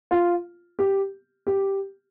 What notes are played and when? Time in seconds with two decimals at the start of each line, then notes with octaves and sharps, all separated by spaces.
0.11 F4
0.79 G4
1.47 G4